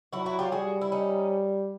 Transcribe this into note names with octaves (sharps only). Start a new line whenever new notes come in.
F#3 E4 F#4
E4 F#4
F4 G4
G3 F#4 G#4
E4
C#4 D#4